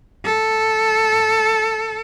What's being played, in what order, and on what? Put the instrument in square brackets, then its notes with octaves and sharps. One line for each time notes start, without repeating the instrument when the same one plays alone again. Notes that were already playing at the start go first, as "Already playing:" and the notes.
[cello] A4